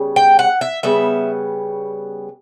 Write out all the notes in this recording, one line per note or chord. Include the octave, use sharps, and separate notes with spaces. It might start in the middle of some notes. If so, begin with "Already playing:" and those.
Already playing: C#3 G3 B3
G5
F#5
E5
C#3 G3 B3 E5